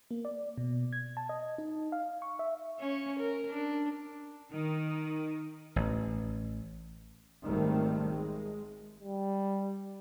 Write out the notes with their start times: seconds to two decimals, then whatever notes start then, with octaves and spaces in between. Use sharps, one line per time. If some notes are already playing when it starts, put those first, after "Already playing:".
0.11 A#3
0.25 D5
0.58 B2
0.93 G#6
1.17 A5
1.29 D#5
1.58 D#4
1.92 F5
2.22 C#6
2.39 E5
2.80 C#4 C#5
3.19 A#4
3.50 D4
4.52 D#3
5.76 A1
7.45 G#1 D#3 G3 A3 C4
8.09 G#3
9.01 G3